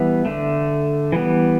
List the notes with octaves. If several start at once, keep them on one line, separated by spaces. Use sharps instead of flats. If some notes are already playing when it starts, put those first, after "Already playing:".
Already playing: E3 G3 B3 E5
D3 A3
E3 G3 B3